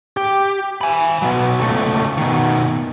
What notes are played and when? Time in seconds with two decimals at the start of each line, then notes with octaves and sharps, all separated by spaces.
0.17 G4
0.81 G#5 B5
1.22 B2 F#3
1.61 C#2 A3
2.17 B2 D#3